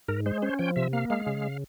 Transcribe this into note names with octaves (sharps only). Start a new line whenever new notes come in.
G#2 A#4
G#3 C5
C#4 C5
F3 G5
C3 E5
A#3 F5
G#3 F5
C#3